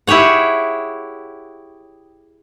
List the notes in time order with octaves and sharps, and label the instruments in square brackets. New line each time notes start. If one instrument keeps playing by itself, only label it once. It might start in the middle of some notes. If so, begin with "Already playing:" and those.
[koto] E4 G4 G#4 C#5 F#5